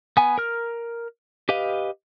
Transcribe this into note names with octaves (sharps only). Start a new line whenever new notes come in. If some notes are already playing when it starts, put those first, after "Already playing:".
B3 G#5
A#4 F6
G4 B4 D#5 F5